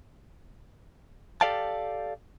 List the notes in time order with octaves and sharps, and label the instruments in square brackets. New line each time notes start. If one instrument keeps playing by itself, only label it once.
[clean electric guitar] G4 A4 D5 F5 G5 A5